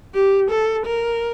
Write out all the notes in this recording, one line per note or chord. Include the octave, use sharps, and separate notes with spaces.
G4
A4
A#4